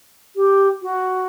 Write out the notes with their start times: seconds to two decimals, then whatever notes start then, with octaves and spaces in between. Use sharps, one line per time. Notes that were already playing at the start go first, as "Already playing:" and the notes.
0.36 G4
0.82 F#4